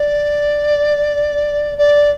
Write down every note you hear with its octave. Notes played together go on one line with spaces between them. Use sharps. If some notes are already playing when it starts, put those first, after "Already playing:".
Already playing: D5
D5